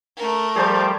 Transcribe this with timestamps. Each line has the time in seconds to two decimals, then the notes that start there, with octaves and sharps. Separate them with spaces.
0.17 A3 A#4
0.56 F3 G3 G4 G#4 C5 A5